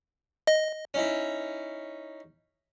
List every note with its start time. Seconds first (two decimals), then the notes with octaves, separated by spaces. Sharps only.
0.47 D#5
0.94 C#4 D#4 E4